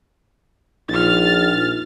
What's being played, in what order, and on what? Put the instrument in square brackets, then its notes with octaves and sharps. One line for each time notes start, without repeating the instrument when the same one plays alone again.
[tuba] A#1 [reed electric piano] D#4 F4 [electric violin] F6 A6